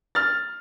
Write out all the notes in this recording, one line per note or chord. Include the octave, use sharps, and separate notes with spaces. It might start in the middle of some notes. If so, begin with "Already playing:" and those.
F6 A6